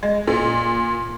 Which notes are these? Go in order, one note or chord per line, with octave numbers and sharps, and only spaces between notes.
G#3
A#2